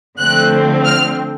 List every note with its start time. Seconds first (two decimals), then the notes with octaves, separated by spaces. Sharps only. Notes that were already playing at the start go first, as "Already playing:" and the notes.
0.19 D3 F3 A3 C4 F#6
0.86 F6